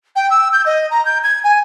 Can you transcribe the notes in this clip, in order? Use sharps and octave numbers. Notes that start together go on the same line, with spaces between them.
G5
E6
G6
D#5
A#5
G6
G#6
G#5